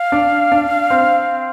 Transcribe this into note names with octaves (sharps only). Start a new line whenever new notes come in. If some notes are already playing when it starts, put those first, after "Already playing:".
Already playing: F5
D4
D4
C4